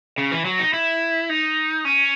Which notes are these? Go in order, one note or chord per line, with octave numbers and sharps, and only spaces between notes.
C#3
E3
F#3
D#4
E4
D#4
C#4